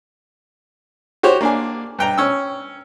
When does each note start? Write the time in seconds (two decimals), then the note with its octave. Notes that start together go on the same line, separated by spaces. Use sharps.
1.23 F#4 G4 C5 C#5
1.41 A#3 D4 G#5
1.99 G2 G5 A#5
2.18 C#4 E6